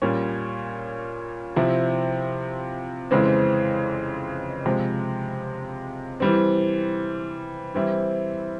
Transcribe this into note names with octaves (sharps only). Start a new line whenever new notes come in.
A#2 G3 C#4
C3 F3 C4 E4
F2 C#3 E3 G#3 C4
C3 F3 G#3
E3 G3 C4
E3 G3 C4 E4